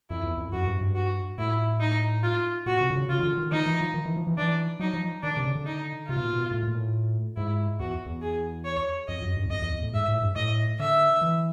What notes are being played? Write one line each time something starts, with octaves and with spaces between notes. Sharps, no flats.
F2 E4
E2
F2
F#2 F#4
G2
G2
F#4
A2 E4
D#4
F4
A#2 F#4
C3
D3
C#3
C#3 F4
D#3
D3
D#3
D#3 D#4
E3
F3
D#3
E3
F3
E3
E3 D4
F#3 D#4
F3
D#3 D4
C3
C#3
D3
D#4
C3 F4
B2
A#2
B2
A2
A#2
A2
G#2 E4
E2 F#4
E2
G#4
C#5
F2 D#5
F#2
G2
E2
F2 D#5
E2
E2
A2
G#2 E5
A2
G2
A2 D#5
D3 E5
E3